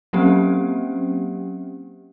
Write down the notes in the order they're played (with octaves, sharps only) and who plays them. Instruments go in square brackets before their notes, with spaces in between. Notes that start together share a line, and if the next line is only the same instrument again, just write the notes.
[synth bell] F#3 A#3 C4 C#4 G4